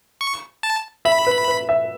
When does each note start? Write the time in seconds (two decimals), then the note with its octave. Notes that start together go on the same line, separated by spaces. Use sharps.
0.21 C#6
0.63 A5
1.05 E5 B5
1.27 B4
1.48 B4
1.69 E5